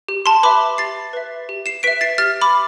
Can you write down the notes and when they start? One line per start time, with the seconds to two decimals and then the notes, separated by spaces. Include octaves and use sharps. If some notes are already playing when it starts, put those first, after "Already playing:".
0.09 G4
0.26 A5 C6
0.43 B4 E5 B5 D6
0.78 G4 A6 C7
1.13 B4 E5
1.49 G4
1.66 C7 E7
1.83 B4 E5 B6 D7
2.01 A6 C7
2.18 G4 F6 A6
2.41 B5 D6